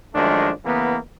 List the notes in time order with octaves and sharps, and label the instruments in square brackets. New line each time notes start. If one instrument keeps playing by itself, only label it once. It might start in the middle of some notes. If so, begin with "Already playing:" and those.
[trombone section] F#2 D#3 F3 G#3 A3 D4
C#3 E3 A#3 B3